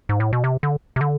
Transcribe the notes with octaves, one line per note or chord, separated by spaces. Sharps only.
G#2
A2
B2
C3
D3
C3
D3